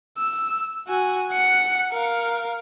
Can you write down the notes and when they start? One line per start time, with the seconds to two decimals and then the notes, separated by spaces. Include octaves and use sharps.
0.18 E6
0.88 F#4 G#5
1.32 F#5 C#7
1.92 A#4 F5